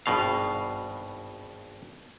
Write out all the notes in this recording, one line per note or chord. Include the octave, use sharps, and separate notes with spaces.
G#1 G2 B2 F5